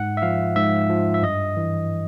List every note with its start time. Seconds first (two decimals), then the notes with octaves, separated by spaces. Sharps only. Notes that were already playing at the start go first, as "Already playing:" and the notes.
Already playing: G#2 F#5
0.17 E5
0.22 F3 F5
0.56 G#2 E5
0.90 F3
1.14 E5
1.22 G2 D#5
1.57 E3